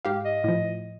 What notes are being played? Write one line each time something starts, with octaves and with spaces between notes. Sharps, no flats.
G#2 G4 F5
D#5
A2 F3